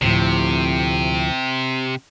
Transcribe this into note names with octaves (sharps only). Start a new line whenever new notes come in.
D2 A2 C3 F3